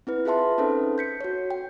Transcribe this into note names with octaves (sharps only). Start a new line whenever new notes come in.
C4 E4 B4
F4 G#4 B4 E5 A5 C6
C4 C#4 D#4 A4 B4 C5
G6 B6 C#7
F#4 C#5
G5